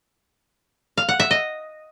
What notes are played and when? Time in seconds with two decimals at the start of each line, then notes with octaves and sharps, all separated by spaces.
0.97 F5
1.09 F#5
1.20 E5
1.31 D#5